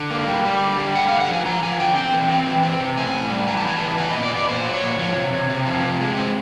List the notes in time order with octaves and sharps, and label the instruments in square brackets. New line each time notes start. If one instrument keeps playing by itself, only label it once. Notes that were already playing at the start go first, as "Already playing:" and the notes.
Already playing: [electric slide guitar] D3
A#3
G3
G3
D3
G3
A3 F#5
F5
D3
F#5
F3 G#5
F3 A#5
F3 G#5
D3 G5
C4 G5
E3
C4
E3
C4
C3
A2 G#5
A2
G3
E3 A#5
A5
B3 G#5
E3 A5
B3 G#5
A#2 D#5
D5
B3
D5
A#2 C5
F#3
C#5
A#2
F3 C#5
C3
C3
C3
F3
C3
G#3
C4